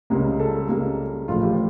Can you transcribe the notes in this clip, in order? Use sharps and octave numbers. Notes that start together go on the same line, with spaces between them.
C#2 C#3 G3 A#3
A4
C#2 C#3 G3 A#3
A1 A2 F3 A3 F4
G4